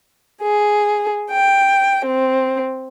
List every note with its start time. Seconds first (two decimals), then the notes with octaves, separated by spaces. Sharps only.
0.41 G#4
1.31 G5
2.05 C4